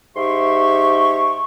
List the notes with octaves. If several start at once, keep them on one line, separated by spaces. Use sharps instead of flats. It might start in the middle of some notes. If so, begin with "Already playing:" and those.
G#2 G4 E5 C6 C#6